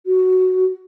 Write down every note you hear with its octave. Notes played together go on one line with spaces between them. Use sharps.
F#4